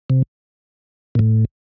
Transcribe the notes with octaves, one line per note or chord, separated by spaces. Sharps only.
C3
A#2
A2